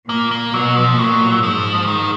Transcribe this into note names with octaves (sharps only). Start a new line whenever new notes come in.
A#2 A#3
A#3
B2 F#3
F3
A#2 F#3
G#2 F3
D#3